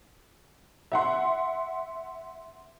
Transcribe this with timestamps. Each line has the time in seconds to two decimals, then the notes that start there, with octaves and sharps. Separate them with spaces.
0.92 E5 F#5 C6